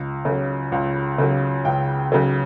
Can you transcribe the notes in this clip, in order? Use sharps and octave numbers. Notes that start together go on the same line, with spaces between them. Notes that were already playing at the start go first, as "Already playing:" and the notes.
Already playing: C#2
C#3 F#3
C#2
C#3 F#3
C#2 G5
C#3 F#3